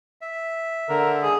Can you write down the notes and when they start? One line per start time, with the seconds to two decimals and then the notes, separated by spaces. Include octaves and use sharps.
0.21 E5
0.89 D3 A#4
1.23 G#4